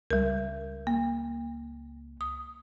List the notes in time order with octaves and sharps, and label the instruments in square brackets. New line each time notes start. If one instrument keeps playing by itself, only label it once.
[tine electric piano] C#2 [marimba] G3 A#4
[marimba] A#3
D#6